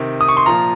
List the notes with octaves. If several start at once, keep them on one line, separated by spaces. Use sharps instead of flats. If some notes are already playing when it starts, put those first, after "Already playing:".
Already playing: C3 D#3
D#6
C#6
C6
A#2 F3 A#5